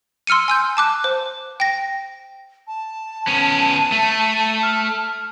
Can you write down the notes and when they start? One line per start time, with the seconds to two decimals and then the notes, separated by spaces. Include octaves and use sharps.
0.27 C6 E6 F6 C#7 D#7
0.48 G#5 E6 G6
0.77 A5 D6 F#6
1.04 C5
1.60 G5 A#6
2.67 A5
3.27 B3 C#4 D#7
3.92 A3
4.63 F6